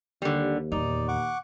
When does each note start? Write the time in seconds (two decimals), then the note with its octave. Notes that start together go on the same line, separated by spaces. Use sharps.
0.22 D#2 D3 G3
0.72 E2 A#2 D#4 D5
1.08 F#5 C#6 D6